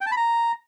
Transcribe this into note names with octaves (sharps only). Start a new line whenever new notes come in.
G5
A5
B5
A#5